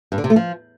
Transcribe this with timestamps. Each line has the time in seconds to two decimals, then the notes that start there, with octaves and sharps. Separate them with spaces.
0.12 G2
0.18 D3
0.24 C3
0.30 A3
0.36 F3